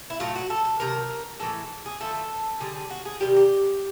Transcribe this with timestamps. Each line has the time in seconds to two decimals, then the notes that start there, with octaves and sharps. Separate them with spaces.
0.10 E4
0.20 A2 F#3 A3 F4
0.35 F#4
0.50 A4
0.65 A4
0.80 C3 D#3 F#3 A#4
1.40 A2 E3 G#3 A4
1.86 G#4
2.00 D3 F3 A3 A4
2.15 A4
2.60 D3 G3 G#4
2.75 G#4
2.90 F#4
3.05 G#4
3.21 C3 D#3 G3 G4
3.36 G4